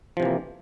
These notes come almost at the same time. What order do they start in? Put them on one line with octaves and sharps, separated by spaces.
F3 C3 E3 A#3